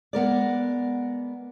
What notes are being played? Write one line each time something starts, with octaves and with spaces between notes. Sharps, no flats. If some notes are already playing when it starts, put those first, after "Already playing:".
G#3 B3 A#4 D5